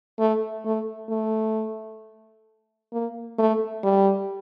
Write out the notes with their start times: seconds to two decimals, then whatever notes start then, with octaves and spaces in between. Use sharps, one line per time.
0.19 A3
0.65 A3
1.09 A3
2.93 A#3
3.39 A3
3.83 G3